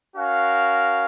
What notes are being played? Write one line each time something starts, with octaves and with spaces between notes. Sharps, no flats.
C#4 F#4 A#4 F5